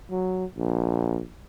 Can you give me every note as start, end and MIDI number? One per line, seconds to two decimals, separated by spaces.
0.10 0.45 54
0.58 1.21 34